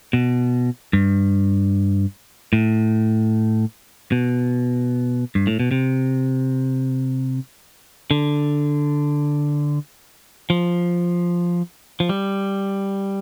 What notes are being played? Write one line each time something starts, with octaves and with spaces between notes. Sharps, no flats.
B2
G2
A2
B2
G2
A2
B2
C3
D3
F3
F3
G3